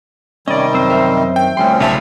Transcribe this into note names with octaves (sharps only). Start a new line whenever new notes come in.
C3 D#3 G3 C#4 D5 D#5
F#2 C4 C5
A#4 E5
D#3 G5
D2 G2 F3 C4 C#4 C6
B1 C#3 F4 E5 A5